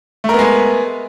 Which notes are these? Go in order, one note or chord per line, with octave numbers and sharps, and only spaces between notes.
G#3 A3 B3 A#4